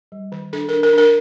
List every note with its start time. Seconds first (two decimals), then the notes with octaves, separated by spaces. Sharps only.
0.12 G3
0.32 D#3
0.53 D4 A4
0.69 D4 A#4
0.83 A#4
0.93 D4 A#4